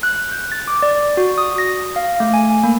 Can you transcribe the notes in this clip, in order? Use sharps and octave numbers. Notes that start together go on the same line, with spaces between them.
F#6
G6
A6
D6
D5
F#4
D#6
A#6
F5
A3
G#5
A#3